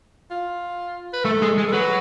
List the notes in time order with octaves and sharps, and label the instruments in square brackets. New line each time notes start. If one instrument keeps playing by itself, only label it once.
[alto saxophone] F4
B4
[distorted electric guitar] A3 [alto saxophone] A4
[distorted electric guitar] G#3
G#3
[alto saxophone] A4
[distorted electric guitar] F#3 [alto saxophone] B4